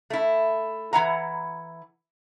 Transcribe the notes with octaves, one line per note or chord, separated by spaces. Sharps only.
A3 E4
E3 E4 F#5 A#5